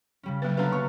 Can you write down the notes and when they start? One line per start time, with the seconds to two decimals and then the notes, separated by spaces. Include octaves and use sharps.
0.23 C#3 G3 C#4
0.42 F#3 A#3 B4
0.57 D3 F#3 B3 B4 F5 A5 A#5
0.72 C#5 C#6